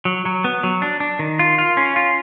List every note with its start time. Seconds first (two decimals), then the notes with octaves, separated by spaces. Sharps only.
0.05 F#3
0.25 F#3
0.44 B3
0.63 F#3
0.82 D4
1.00 D4
1.19 D#3
1.39 F4
1.58 F4
1.77 C#4
1.96 F4